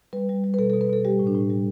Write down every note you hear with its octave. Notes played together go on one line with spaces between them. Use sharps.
G3 B4
G3
G3
B4
B2 A4
A4
B2
B4
B2 A4
G3 G4
A2
D4
A2
G3